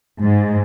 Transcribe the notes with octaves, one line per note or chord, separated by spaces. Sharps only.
G#2